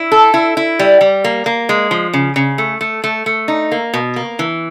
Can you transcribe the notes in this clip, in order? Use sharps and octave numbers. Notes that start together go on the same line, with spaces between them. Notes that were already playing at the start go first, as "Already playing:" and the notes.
Already playing: E4
A4
E4
E4
G3
G3
A#3
A#3
G#3
F3
C#3
C#3
A3
A3
A3
A3
D#4
A#3
B2
A#3
E3